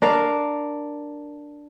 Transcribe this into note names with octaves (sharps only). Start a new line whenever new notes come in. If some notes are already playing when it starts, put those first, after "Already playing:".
D4 A#4 F5